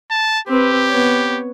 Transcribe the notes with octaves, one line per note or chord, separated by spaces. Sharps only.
A5
C4 G4 B4
B3 C#5